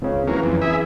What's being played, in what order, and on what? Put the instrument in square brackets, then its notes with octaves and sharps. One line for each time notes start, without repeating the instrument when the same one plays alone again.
[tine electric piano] C#2 C#3 [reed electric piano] C4 C#4
[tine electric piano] E3 [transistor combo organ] F#3 A#3
[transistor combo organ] F2
E4 G#4 E5